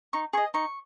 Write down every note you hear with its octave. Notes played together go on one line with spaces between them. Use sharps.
D#4 C#6
G#4 D#5 C#6
D#4 C#6